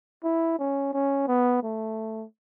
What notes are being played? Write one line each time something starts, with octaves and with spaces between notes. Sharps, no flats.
E4
C#4
C#4
B3
A3